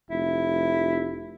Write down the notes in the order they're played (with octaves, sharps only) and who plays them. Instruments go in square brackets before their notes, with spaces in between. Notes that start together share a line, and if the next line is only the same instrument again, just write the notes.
[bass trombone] F1 [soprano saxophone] E4